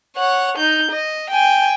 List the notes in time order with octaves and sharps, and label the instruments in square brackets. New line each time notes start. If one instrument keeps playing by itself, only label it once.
[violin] C#5 F#5
D#4 G6
D#5
G5 G#5